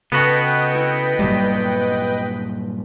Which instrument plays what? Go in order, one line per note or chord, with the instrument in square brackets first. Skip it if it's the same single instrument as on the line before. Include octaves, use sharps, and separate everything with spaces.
[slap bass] C#3 [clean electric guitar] B3 F#4 [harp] A4 [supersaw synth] B4 D#5 G5
[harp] E4
[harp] G2 [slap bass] A#2 F#3 G3